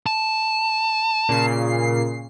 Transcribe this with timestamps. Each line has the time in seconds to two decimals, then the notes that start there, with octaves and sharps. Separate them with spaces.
0.07 A5
1.29 A#2 C#3 C7